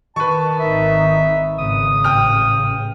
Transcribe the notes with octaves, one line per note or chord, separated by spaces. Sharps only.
D#3 B4 A5 C#6
G#1 D#4 E5
G#1 C#3 D#6
A1 G5 F6